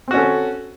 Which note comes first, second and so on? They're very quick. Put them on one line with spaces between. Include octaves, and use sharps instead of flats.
C4 F#4 C#4 A4